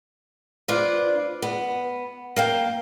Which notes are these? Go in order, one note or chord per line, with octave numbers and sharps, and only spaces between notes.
D4 F4 B4 C5 D5
B3
A#3 F5 G5